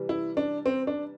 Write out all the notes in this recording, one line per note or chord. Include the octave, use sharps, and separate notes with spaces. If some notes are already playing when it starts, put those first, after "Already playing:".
Already playing: C3 E3 G3
E4
D4
C4
D4